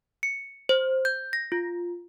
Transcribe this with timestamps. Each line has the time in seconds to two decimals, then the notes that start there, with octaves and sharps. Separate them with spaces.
0.23 C#7
0.69 C5
1.05 G6
1.33 A#6
1.52 F4